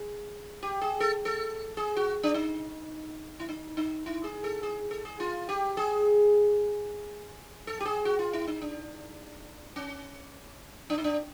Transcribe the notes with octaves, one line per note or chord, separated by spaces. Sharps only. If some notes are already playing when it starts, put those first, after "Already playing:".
Already playing: G#4
G4
G#4
A4
A4
G#4
F#4
D4
D#4
E4
D#4
D#4
E4
G#4
A4
G#4
A4
G#4
F4
G4
G#4
A4
G4
G#4
F#4
F4
E4
D#4
D4
C#4
D4
D#4
D4